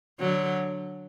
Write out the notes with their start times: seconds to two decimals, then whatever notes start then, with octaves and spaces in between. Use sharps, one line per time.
0.20 D3 F#3